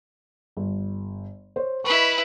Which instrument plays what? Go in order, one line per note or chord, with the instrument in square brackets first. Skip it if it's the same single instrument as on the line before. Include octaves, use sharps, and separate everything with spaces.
[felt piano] G1
C5 C#5
[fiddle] E4 B4 [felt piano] D#5 B5 C#6